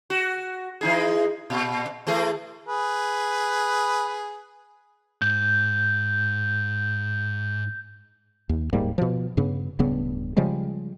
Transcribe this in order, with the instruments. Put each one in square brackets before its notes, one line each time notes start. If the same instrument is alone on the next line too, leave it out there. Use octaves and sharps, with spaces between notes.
[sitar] F#4
E3 D#4 G#4
A#2
E3 A3 G#4
[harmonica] G#4 B4
[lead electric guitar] G#2 [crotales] G6
[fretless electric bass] D#2
D1 G#2 G3 A#3
B2 F3
G2 C#3 B3
D1 G2 C#3 B3
C#3 F3 G3 G#3